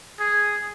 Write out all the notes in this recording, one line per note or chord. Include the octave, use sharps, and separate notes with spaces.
G#4